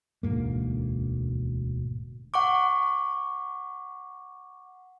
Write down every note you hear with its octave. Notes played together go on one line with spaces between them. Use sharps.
E1 D2 G#2 A#3
F#5 C#6 D6